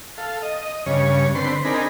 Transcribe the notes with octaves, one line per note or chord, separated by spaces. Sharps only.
A4 F5
D#5
G2 C#3 C#5
D3 C4 B4 C6
C4 D4 D#4 G#4 A#4 B5